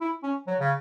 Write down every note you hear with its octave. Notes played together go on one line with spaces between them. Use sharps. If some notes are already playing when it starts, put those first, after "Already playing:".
E4
C#4
F#3
C#3